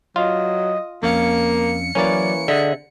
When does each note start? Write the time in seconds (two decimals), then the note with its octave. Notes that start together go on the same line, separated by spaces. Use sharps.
0.16 F#3 F4 D#5
1.03 F2 A#3 C#4 F5 C#7
1.95 E3 F#3 A#3 C#4 D5
2.48 D3 G#4 D#5 E5